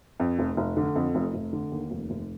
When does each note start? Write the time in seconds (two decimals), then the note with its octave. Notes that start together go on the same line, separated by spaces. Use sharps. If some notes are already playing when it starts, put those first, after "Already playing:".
0.20 F2
0.39 F1
0.57 F1
0.77 D3
0.96 F2
1.15 F1
1.34 F1
1.53 D3
1.72 D#2
1.91 F1
2.10 F1